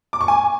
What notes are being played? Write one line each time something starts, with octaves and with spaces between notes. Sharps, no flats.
D6
C#6
G#5